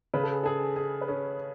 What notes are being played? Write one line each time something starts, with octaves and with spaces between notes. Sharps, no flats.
C#3 B4
A4
G#4
G#4 A4
G#4
B4
C#4 A4